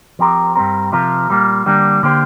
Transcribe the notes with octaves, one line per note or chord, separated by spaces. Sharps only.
F3 C4 G4 A#4
G2 G3 C4 A#4
C3 F3 C4 F4 A#4
A#2 G3 A#3 F4
D3 G3 A#3 D4
D3 A#3 G4 C5